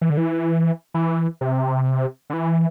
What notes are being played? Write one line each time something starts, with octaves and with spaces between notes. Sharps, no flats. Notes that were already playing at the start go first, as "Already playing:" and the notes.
E3
D3
E3
E3
C3
D3
E3